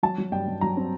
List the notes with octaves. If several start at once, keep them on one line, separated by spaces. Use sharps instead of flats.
F#3 A5
F#3
G2 G5
G2
F#3 A#5
C4